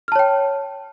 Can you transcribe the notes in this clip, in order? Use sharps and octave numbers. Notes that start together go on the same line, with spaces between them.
C#5 G5 A5 F6